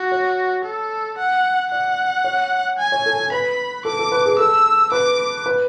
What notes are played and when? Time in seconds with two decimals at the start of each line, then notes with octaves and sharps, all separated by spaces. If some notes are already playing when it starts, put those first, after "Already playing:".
Already playing: F#4
0.12 C#5
0.65 A4
1.18 F#5
1.71 D5 F#5
2.24 C#5
2.79 G#5
2.92 C#5
3.06 A4
3.18 A4
3.31 B4 B5
3.85 A4 D6
3.99 A4
4.12 B4
4.26 G#4
4.39 A4 E6
4.92 B4 D6
5.46 B4